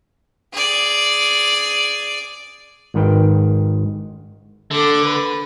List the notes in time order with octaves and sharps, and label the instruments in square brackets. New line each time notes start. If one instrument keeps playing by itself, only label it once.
[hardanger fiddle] G#4 D5
[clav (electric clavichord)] G#1 G#2 D#3 B4 G5
[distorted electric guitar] D3 [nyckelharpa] A4 D6
[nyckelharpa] B4